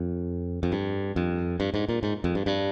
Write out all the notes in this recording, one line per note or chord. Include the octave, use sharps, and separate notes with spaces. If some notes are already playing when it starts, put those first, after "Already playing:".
Already playing: F2
F2
G2
F2
G2
G#2
A#2
G#2
F2
G2
G2